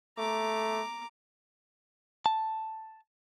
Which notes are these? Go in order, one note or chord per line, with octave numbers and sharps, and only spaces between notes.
A3 A#5 D6
A5